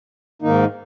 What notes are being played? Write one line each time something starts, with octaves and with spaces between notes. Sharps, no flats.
G#2 D#3 A#3 D#4